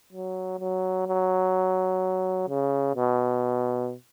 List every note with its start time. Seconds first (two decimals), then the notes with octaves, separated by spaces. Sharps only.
0.12 F#3
0.60 F#3
1.07 F#3
2.48 C#3
2.96 B2